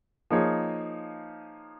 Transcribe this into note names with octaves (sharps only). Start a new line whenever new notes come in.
F3 A#3 D#4 G#4 C#5